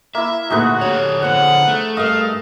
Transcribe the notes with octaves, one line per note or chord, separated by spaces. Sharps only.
A#3 E4 E5
D2 A#2 D#4 F#4 G#4 B4
D3 G4 C#5
F3 B3 F#5
A3
G2 A#4 D#5 F5